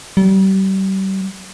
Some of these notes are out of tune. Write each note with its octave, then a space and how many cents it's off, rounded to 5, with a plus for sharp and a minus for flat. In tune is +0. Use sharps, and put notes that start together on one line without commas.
G3 -35